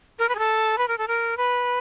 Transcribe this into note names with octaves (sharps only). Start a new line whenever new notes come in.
A#4
B4
G#4
A4
B4
A#4
A4
A#4
B4